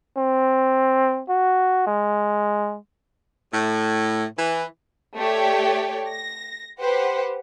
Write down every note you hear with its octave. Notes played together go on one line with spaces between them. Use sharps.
C4
F#4
G#3
A2
E3
A3 G4 C#5 D5 G5
A#6
G4 B4 C5 F#5